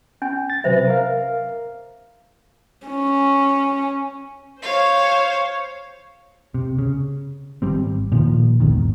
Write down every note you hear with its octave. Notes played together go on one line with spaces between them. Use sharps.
C#4 G#5
A6
C3 F#3 B4 C5 E5
A#4 F5
C#4
C5 C#5 F5
C3
C#3
G#1 G3 C4
A#2 D#3 F3
D1 G#1 E2 D#3